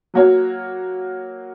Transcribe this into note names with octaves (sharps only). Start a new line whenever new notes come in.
F#3 A#3 F#4 C#5